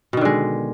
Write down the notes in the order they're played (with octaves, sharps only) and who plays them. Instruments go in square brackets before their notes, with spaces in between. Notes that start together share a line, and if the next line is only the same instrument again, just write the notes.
[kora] B2
D#3
D3
G#3